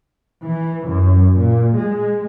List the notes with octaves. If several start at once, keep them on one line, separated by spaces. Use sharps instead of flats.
E3
F#2
A#2
G#3